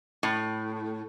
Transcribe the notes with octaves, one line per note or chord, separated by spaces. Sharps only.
A2